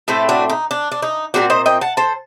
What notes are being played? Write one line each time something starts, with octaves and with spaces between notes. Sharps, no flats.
A2 A3 C4 A4
D4 F#4
D#4
D4
D4
D#4
A#2 F#3 C4 D4 F#4
C5 D#5
D#5 G5
F#5 A5
A4 C5